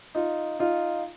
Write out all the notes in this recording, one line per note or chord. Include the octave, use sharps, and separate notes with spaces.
D#4 F4
D#4 F4